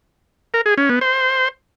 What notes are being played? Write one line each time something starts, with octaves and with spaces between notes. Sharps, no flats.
A#4
G#4
C#4
B3
C5